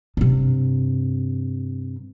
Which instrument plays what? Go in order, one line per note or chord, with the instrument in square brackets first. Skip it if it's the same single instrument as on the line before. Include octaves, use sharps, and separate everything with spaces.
[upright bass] G2 C3